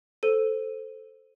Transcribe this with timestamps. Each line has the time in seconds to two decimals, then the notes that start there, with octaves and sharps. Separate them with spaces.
0.23 A4 C5 D#7